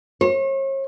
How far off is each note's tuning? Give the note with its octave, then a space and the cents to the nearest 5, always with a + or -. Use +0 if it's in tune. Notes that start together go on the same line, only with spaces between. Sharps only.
C#5 -40